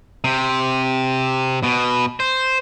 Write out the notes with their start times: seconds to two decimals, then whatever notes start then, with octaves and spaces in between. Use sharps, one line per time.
0.24 C3
1.63 B2
2.20 C5